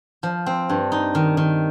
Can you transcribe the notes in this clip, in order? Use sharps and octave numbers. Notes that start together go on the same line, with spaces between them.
F3
C4
G2
D#4
D#3
D#3